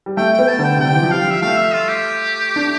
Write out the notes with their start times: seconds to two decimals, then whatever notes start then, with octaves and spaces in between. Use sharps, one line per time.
0.06 G3
0.17 A3 G5
0.33 G5
0.39 B3
0.48 A5
0.59 D3
0.64 G5
0.76 C3
0.80 D3 G5
0.94 E3
1.02 F3
1.11 G3 F5
1.31 E5
1.42 A3 F5
1.57 E5
1.73 F4
1.88 G4
2.56 D4